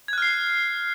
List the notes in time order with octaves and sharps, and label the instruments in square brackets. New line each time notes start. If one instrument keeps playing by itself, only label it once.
[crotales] G#6
F#6
F6
C7